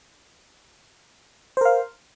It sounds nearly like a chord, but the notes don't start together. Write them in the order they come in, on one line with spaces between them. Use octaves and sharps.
C5 A#4 F5